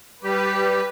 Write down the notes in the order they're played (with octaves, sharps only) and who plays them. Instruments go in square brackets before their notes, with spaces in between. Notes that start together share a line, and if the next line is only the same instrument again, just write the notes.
[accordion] G3 G4 [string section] B4